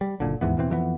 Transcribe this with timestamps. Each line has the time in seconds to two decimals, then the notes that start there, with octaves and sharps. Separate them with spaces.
0.01 G3
0.20 F#1 C2 A#2 D3
0.41 D#2 G#2 E3 B3
0.57 E2 B2 E3 C4
0.70 F2 E3 A#3 B3